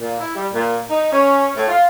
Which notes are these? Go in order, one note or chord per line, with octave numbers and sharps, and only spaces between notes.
A#2
E4
G3
A#2
D#4
C#4
A2
F4